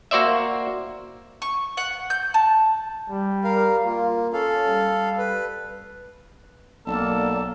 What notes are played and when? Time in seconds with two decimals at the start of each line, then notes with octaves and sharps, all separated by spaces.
0.11 A#3 F#4 C5 D5 E5
1.42 C#6
1.77 F#5
2.10 G6
2.34 A5
3.09 G3
3.44 A#4 F5
3.84 A#3 F4
4.33 C#4 A4 F5
4.67 G3
5.18 B4
6.87 B1 A#3 A4 D5